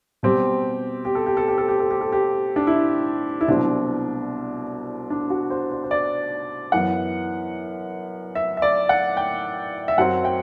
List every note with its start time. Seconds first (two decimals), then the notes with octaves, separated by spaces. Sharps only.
0.23 B2 G3 C4 G4
1.05 G4
1.15 A4
1.26 G4
1.37 A4
1.48 G4
1.58 A4
1.68 G4
1.80 A4
1.91 G4
2.01 A4
2.12 G4
2.56 D4
2.67 E4
3.41 E4
3.48 C2 B2 F#3 C4 D4
5.10 D4
5.30 F#4
5.50 C5
5.71 C5
5.84 C5
5.91 D5
6.72 F#2 E3 B3 F#5
8.35 E5
8.57 E5
8.62 D5
8.89 F#5
9.17 G5
9.88 E5
9.98 F#2 F#3 C4 F#5
10.25 G5